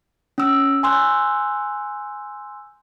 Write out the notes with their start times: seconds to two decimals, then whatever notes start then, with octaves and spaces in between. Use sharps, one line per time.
0.38 C#4 E6
0.83 G#5 C6 E6 F#6 G6